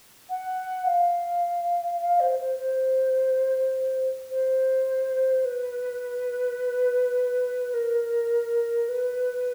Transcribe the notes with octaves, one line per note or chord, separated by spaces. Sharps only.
F#5
F5
F5
C5
C5
C5
C5
B4
A#4
B4